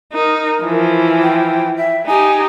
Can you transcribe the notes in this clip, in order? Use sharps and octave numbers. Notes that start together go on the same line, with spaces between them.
D#4 A#4
E3 F3
G5
E5
D#4 G4 G#5